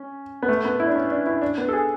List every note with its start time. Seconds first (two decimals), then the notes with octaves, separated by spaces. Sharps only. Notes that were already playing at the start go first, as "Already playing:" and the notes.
Already playing: C#4
0.42 B3
0.49 A3
0.65 B3
0.80 E4
0.87 D4
0.95 C#4
1.11 D4
1.26 E4
1.42 D4
1.58 B3
1.68 A4
1.73 G#4